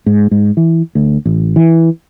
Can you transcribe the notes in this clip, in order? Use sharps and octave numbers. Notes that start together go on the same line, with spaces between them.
G#2
G#2
E3
D2
A1
E3